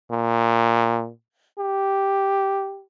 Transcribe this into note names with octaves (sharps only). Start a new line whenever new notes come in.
A#2
G4